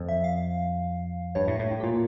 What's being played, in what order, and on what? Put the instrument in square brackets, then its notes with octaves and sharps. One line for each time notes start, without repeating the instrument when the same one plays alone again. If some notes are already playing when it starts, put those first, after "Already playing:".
Already playing: [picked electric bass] F2
[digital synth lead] E5
F5
[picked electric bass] G2 [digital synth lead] C#5
[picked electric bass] A2
A2
A2
[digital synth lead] G4
[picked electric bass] A#2 [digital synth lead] F4